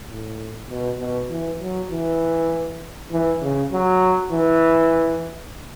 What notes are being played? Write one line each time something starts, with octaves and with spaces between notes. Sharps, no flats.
A2
B2
B2
E3
F#3
E3
E3
C#3
F#3
E3